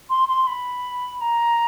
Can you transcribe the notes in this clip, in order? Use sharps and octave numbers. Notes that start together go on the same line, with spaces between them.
C6
C6
B5
A#5